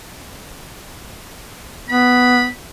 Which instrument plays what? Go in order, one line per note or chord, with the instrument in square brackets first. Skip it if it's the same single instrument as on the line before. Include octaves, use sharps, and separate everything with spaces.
[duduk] B3 [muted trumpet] B5